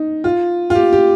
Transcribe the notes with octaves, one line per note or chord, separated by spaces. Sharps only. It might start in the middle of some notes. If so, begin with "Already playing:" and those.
Already playing: D#4
F4
F4
G4
G4